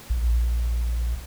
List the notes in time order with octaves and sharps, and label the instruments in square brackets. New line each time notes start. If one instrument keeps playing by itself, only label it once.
[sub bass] A#1